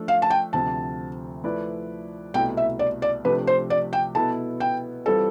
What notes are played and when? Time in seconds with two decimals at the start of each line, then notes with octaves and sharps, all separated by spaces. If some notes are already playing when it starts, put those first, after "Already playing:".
Already playing: F3 A3 D4 A4
0.08 F5
0.22 A5
0.30 G5
0.53 D2 C3 F3 C4 A5
1.43 F3 A3 E4 B4 D5
2.34 C2 B2 A3 E4 G5
2.57 E5
2.79 D5
3.02 D5
3.25 C3 F3 A3 D4 G4 B4
3.47 C5
3.70 D5
3.93 G5
4.15 B2 B3 E4 A4 A5
4.60 G5
5.05 E3 G3 C4 F4 A4